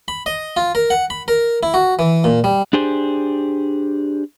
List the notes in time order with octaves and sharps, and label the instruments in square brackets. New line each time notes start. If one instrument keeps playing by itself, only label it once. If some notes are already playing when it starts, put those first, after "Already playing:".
[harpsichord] B5
D#5
F4
A#4
F#5
B5
A#4
E4
F#4
E3
A#2
G3
[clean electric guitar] D4 G4 G#4 C5